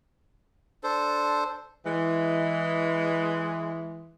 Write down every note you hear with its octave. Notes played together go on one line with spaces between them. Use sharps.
D4 A4 C5
E3 G#3